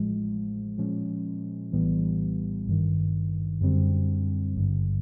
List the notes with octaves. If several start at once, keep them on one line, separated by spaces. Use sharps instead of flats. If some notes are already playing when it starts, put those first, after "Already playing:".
Already playing: A1 A2 F3 G#3
A#2 F3 G#3 C#4
A#1 A2 E3 G3 B3
G#1 G2 D#3
F#2 D3 G3 C4
G#1 G2 D3